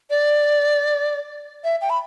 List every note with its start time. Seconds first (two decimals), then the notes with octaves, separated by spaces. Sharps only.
0.10 D5
1.64 E5
1.81 G5
1.90 B5